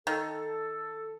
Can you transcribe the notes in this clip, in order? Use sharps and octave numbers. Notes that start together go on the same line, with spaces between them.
D#3 A4